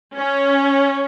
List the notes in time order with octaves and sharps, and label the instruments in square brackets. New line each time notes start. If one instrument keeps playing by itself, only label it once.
[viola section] C#4